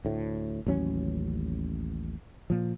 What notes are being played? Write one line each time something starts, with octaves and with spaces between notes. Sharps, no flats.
D2 A2
A1 D#2 F#3 C#4
A#2 F3